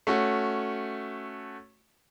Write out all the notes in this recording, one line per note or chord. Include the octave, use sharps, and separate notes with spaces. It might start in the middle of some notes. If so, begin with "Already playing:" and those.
A3 C#4 F#4